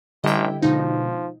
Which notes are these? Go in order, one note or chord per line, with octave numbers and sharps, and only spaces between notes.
A1 D3 G3 E4 D#5 G5
B2 D3 F3 G#3 D#4